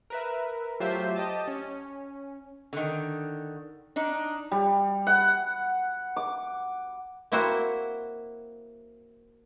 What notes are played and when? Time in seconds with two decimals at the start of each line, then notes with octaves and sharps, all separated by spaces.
0.10 A#4 B4 E5
0.80 F#3 A3 F4 G4 C5 E5
1.16 G4 D#5 A5
1.48 C#4
2.73 D3 D#3
3.96 D4 D#4
4.52 G3
5.07 F#5
6.16 D6
7.32 A#3 C4 E4 F#4 C5